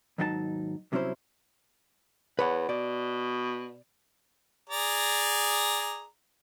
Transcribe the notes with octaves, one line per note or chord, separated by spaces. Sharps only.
D#2 G#2 F#3 D#4 A4 A5
C2 C3 F#3 C#4 E4 C5
E2 B4 C#5 F#5
B2 D5
G#4 D5 A#5